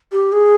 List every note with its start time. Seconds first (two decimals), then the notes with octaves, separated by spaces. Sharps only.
0.12 G4
0.32 G#4